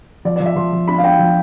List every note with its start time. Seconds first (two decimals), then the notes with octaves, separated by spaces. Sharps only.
0.25 F3 D5
0.36 F3 D5
0.46 E5
0.56 F3 C6
0.72 F3
0.88 D4 B5
0.98 F5
1.04 D4 G5
1.19 F3